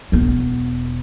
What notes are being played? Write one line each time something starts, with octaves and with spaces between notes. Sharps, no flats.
E1 B3